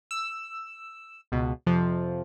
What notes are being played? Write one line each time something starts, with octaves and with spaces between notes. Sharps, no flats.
E6
C#2 B2
F2 C3 F3